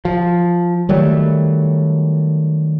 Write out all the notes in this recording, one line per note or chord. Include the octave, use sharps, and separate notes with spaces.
F3
D#3 F#3 G3 A3